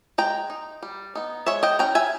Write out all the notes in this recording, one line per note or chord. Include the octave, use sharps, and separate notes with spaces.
G#3 G5 A#5
D#4
G3
B3 D#4
G#3 C#5 E5
D#5 G5
C#4 E4 G5 A#5
E5 G#5